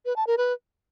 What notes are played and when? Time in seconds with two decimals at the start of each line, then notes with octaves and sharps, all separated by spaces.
0.06 B4
0.16 A5
0.27 A#4
0.38 B4